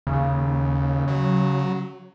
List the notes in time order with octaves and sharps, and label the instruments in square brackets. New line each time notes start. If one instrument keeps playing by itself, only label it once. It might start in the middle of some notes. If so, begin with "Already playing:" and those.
[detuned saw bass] D#2 [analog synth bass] C#3
[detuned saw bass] F#3